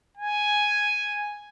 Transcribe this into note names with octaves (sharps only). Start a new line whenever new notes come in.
G#5